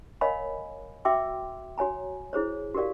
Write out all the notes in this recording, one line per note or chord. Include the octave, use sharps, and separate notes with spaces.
A#4 C#5 D#5 F5 G#5 B5
F#4 E5 G5 C6 D6 E6
F#4 C#5 G#5 A#5
E4 G#4 C5 C#5
F#4 G4 A#4 D5 F5